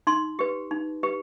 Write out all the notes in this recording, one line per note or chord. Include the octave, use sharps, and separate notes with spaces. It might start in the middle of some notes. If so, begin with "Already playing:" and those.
D#4 C6
G4 B4
D#4
G4 B4